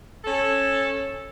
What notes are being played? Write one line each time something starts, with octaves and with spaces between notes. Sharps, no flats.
C#4 A4